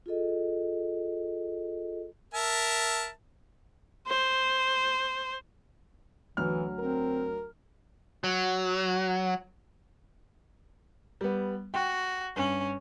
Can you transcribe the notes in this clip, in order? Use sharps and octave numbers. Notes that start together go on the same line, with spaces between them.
F4 G#4 A4 D#5
A#4 E5 A5
C5
D2 E3 F#3 F6
C4 A#4
F#3
G3 B3
F#4 G5
G2 C#4